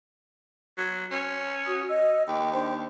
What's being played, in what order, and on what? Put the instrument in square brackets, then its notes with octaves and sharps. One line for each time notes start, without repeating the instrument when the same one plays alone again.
[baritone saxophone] F#3
C#4
[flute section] F#4 D#6
D#5 E6
[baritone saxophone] D#2 [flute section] G5
[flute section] D4 C5 G5